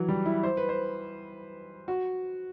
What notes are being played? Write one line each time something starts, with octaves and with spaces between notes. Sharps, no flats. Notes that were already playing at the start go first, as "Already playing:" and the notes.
Already playing: E3 F#3
G3
E4
C5
B4
C5
F#4